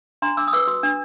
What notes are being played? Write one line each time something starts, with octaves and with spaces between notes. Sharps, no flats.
D4 A#5 C6
D4 D6 E6
D#6
B4 D6 E6
F#4
D4